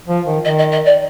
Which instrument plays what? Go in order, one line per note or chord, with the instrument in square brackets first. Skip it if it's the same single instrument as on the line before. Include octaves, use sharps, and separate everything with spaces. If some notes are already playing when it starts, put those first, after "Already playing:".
[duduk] F3
D#3
[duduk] D#3 [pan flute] D#5
[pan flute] D#5
D#5
D5